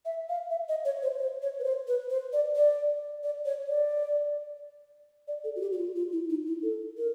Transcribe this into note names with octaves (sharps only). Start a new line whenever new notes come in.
E5
F5
E5
D#5
C#5
C5
C5
C#5
B4
C5
B4
C5
D5
D5
D5
C#5
D5
D5
A4
F#4
G4
F#4
F4
F4
E4
D#4
E4
A4
A#4